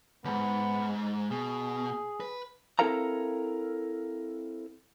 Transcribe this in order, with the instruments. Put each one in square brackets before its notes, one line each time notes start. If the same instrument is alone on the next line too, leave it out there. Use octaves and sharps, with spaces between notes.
[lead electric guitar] D#2 G#2 [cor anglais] B3
[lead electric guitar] B2 [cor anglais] G#4
[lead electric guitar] B4
[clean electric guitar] C4 E4 A4 A#4 F5 A#5